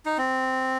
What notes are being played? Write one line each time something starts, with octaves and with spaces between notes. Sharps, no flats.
D#4
C4